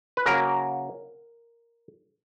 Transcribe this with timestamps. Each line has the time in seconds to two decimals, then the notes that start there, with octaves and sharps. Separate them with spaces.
0.17 B4
0.26 C#3 F#3 A#3 A#4